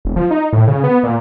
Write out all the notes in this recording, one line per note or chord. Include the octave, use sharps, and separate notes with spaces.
E1
F3
D#4
A2
C#3
B3
A#2